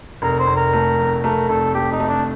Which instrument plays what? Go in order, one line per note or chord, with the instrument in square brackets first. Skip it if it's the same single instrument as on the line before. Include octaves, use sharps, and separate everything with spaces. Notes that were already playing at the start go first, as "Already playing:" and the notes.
[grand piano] F1 [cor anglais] A#4
[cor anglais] C5
[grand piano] F1
[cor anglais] A#4
[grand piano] A3
F2
[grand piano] A3 [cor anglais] A#4
[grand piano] F1 [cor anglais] A4
[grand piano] A3 [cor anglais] G4
[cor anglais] D#4
[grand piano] A3
[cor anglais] D4